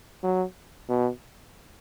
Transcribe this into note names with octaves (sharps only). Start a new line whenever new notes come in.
F#3
B2